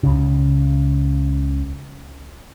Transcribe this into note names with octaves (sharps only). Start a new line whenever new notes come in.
C#2 C#3